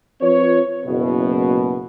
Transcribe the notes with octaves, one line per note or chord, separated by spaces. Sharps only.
F3 C4 F4 B4 C#5
F#1 B2